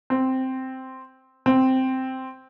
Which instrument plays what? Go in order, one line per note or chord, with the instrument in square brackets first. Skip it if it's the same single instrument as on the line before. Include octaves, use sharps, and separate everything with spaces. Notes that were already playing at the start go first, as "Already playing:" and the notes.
[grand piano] C4
C4